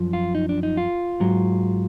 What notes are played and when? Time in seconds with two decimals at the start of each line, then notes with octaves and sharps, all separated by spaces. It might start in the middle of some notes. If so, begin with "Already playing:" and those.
Already playing: F#2 F3
0.13 F4
0.35 D#4
0.49 D4
0.63 D#4
0.77 F4
1.20 G#2 F#3